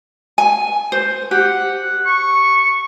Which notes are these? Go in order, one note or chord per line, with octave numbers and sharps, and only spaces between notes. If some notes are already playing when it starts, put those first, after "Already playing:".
G#5
C5
G4 F#5
C#6